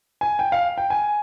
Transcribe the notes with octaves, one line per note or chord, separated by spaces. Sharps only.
G#5
G5
F5
G5
G#5